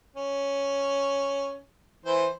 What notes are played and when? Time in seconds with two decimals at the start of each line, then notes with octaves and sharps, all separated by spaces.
0.16 C#4
2.05 E3 C5